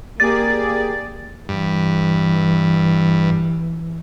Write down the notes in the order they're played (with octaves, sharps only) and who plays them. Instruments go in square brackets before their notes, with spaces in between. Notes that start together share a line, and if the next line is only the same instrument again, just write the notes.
[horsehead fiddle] A#3 [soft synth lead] G4 [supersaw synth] G#4 D5 [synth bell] A6
[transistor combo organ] G2 [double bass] E3